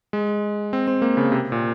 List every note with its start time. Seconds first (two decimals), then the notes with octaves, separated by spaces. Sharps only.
0.13 G#3
0.73 C4
0.87 C4
1.02 A#3
1.17 C#3
1.32 C3
1.52 A#2